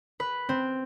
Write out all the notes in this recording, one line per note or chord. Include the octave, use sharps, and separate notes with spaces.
B4
C4